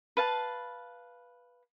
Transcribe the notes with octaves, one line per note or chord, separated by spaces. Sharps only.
B4 F5 A5